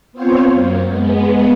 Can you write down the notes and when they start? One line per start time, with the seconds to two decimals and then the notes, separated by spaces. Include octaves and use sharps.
0.12 B3 C4 F4 C5 C#5
0.50 F#2 A#3
0.87 G#3 B3